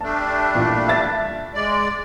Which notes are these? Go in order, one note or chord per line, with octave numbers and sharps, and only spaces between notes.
G3 A3 D4 A5
A1 A#2
E5 A6
G#3 D5